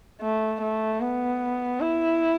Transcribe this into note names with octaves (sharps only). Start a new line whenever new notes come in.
A3
A3
B3
E4